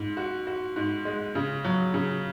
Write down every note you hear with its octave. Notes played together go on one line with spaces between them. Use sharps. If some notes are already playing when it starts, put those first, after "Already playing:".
Already playing: G#2
F#4
F#4
G#2
G#3
C#3
F#3
C#3